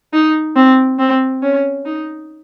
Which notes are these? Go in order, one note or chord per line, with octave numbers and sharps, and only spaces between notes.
D#4
C4
C4
C#4
D#4